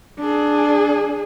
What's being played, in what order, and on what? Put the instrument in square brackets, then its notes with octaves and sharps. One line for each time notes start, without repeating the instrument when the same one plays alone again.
[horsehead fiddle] D4 G#4